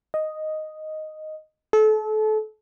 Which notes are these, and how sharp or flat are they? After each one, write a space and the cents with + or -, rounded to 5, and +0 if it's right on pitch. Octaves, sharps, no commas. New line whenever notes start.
D#5 +0
A4 -30